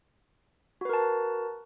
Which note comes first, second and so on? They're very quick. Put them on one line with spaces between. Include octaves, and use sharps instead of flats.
F#4 B4 A#4 A5